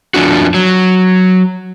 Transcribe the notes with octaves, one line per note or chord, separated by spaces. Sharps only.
F2 F3 C4 D4 F#4
F#3